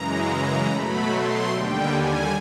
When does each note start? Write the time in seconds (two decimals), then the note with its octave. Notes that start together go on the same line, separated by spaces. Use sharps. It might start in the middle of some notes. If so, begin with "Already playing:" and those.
Already playing: F#2 C#3 E3 G#3 A#5
0.67 B2 F#3 A3 B5
1.09 C6
1.49 D#2 D3 G3 G5
1.89 G#5